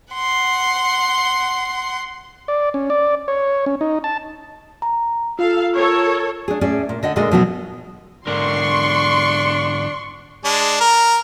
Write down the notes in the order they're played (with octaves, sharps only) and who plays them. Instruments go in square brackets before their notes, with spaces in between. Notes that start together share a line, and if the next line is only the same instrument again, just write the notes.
[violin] F#5 C6
[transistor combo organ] D5
C#4
D5
C#5
C#4
D#4
A5
[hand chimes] A#5
[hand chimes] F4 [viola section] A4 F5
[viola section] A4 A#4 C#5
[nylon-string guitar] D4 G#4
A2 C#4 G#4 D5
A#2
D3 D#5 F#5
A#2 D3 G#3 A4 D5 D#5
B2 F3 F#3 B3 D#4 F#5
[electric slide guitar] G#2 D3 A#4 [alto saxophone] D4 [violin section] C6 C#6
[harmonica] G#3 D4
A#4